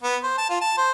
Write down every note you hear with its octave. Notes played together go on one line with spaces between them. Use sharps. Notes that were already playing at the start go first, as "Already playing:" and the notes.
B3
C5
A5
F4
A5
C5